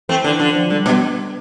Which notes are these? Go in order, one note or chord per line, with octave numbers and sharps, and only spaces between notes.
E3 A3 C4
E3
D3
E3
D3 F3
F3
D3 G3
B2 B3